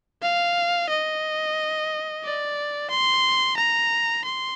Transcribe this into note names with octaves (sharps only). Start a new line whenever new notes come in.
F5
D#5
D5
C6
A#5
C6